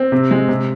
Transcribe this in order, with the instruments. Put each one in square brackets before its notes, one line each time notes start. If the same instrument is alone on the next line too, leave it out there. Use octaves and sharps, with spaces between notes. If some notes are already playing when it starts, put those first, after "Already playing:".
Already playing: [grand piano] C4
C3
G#3
C3